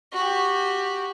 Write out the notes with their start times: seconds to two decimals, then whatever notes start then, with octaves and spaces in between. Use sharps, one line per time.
0.12 F#4 G4